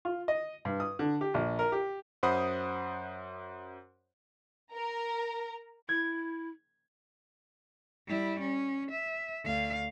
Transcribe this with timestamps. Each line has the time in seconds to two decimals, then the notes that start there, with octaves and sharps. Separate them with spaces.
0.05 F4
0.28 D#5
0.65 G2
0.80 D#6
0.99 D3
1.21 G4
1.34 A#1
1.59 A#4
1.72 G4
2.23 F#2 C5 F#5 B5 D#6
4.73 A#4 A#5
5.89 E4 G#6
8.07 G3 E4
8.39 C#4
8.91 E5
9.44 D2 F5